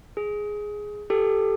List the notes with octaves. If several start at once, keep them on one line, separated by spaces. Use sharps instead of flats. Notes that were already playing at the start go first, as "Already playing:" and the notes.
G#4
G4 A4